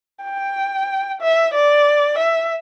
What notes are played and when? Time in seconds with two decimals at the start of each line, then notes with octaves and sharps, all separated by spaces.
0.24 G5
1.22 E5
1.54 D5
2.19 E5